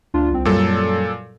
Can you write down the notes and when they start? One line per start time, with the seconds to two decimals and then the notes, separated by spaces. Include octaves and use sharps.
0.14 D2 D4 F4
0.31 C2 C4
0.45 F#2 A#2 F#3 G3 A4